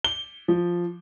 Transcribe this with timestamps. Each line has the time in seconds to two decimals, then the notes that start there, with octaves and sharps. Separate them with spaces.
0.04 G7
0.48 F3